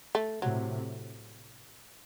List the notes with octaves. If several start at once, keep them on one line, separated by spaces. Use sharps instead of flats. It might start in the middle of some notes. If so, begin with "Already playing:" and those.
A3
A2 C3 F#3